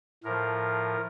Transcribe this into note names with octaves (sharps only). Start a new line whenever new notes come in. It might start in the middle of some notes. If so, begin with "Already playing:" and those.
A2 F3 A#4